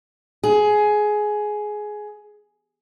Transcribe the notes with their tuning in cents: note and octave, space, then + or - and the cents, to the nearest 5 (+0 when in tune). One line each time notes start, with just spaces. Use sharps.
G#4 +15